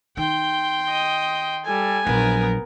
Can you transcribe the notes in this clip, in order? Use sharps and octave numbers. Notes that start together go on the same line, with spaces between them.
D#3 G5 C6
D#5
G3 A4 G#5
A#1 F#3 B3 A#4